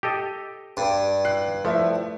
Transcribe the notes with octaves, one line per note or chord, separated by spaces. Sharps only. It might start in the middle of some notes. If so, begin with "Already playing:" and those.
G4 A4 D#5
G2
F#6 C7
F3 A3 E4